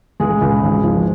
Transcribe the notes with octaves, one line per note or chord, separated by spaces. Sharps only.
C#2 G#3 G#4
C#2
G#1
F3